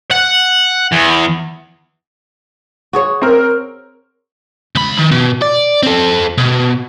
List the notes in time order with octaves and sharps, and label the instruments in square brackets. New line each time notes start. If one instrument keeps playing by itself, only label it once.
[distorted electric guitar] F#5
E2
[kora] F#4 G#4 C#5
[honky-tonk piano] C4 A#4
[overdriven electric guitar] C#2 B5
D#3
B2
D5
C4 A4
B2